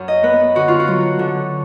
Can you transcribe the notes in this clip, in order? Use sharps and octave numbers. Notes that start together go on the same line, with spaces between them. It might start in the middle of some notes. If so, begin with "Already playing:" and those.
Already playing: F#2
D#5
B3 B4
D3 F#4
F4
F#4
F#3
D3